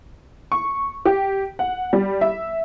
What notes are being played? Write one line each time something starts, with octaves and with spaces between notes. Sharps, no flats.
C#6
G4
F#5
G3
E5